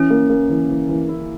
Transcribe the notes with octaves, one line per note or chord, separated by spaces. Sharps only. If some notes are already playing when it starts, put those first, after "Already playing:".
Already playing: E3 C#4
A#3
A#3
E3
E3
E3
E4